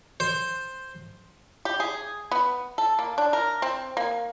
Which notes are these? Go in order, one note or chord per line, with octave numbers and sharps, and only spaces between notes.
C5
G4
G#4
B3
A4
A#3
D4
A#4
C4
A#3